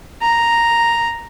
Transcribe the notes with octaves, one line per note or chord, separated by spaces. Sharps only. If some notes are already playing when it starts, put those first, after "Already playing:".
A#5